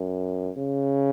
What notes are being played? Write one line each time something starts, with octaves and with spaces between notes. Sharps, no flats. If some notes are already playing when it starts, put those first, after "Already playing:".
Already playing: F#2
C#3